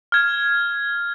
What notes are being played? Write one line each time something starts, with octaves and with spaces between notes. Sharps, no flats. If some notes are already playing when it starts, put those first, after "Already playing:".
F6 G#6